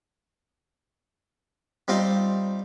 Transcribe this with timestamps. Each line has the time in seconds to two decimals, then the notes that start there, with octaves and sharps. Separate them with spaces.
1.88 G3 C4 D#4 F4 D#5 F5